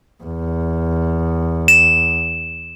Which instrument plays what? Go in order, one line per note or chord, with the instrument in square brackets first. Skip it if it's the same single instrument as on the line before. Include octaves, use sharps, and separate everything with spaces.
[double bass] E2
[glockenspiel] E7